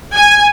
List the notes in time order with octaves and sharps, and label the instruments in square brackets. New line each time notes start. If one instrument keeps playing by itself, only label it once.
[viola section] G#5